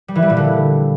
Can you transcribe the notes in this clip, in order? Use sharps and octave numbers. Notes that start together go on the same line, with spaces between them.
G3
E3
G3
A#2
D3